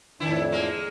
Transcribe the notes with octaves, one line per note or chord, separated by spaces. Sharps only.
F2 A2 D#3 D4 E4
G#3 A#3